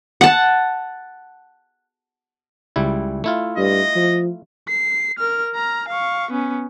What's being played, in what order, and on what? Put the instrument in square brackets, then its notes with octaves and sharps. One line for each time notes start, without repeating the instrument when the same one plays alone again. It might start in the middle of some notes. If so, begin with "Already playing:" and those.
[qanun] F#5 A5
[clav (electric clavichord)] C#2 G3 E4
A3 E4 F4
[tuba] G2 [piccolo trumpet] D#5
[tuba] F3
[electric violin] C7
A#4 F6
A#5 F6
F5 C#6
B3 C#4